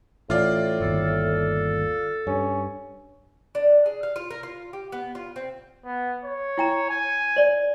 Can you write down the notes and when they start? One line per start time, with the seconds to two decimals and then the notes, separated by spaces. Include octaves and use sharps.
0.30 A1 A2 F4 D5
0.80 G1 D#2 A4
2.27 G2 C#4
3.55 D4
3.86 G#4
4.03 F5
4.16 F4
4.30 A#4
4.43 F4
4.73 G4
4.92 B3
5.15 F4
5.36 C4
5.85 B3
6.24 C#5
6.58 E4 G5 A#5
6.90 G#5
7.36 C5 D5